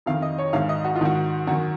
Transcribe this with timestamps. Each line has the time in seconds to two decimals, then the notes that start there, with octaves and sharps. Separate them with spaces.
0.06 F2 D#3 F5
0.22 D#5
0.38 C#5
0.53 G#2 D#3 F5
0.69 D#5
0.85 F#4
0.96 F4
1.01 G#2 D#3 F#4
1.47 F#2 F#4
1.51 D#3